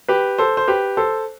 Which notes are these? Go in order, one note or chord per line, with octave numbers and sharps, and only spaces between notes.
G4 B4
A4 C5
C5
G4 B4
A4 C5